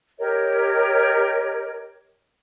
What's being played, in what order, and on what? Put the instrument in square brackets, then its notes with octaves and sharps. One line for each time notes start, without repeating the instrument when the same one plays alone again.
[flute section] G4 A#4 C#5 D#5